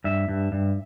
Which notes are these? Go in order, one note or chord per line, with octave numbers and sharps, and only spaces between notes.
G2 E5
G2
G2